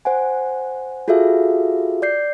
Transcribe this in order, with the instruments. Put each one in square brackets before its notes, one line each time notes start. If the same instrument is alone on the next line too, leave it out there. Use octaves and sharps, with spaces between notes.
[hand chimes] C5 F#5 G#5
F4 F#4 G#4 A4 E5 F5
D5 G6 C7